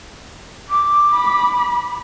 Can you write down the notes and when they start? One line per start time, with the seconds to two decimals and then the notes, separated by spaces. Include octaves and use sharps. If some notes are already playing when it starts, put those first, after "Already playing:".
0.69 D6
1.14 B5